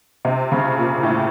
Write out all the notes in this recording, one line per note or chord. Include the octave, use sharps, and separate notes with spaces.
C3
C#3
A#2
A2